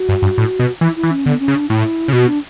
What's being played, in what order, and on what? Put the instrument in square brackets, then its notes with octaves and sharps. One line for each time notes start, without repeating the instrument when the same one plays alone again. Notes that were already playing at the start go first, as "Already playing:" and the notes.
Already playing: [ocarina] F#4
[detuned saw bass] G2
G2
A2
B2
[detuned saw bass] E3 [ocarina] E4
[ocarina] E4
[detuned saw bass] E3
[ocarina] C#4
[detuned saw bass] D3 [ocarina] B3
[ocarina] C#4
[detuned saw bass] C#3
[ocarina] D4
[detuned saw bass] A2 [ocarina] E4
[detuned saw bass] C#3
[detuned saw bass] B2 [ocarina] F#4
[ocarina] D4